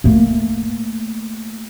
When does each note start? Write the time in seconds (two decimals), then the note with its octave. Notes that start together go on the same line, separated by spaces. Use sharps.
0.04 A3 A#3